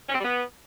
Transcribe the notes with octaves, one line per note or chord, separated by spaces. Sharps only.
C#4
C4
G3
B3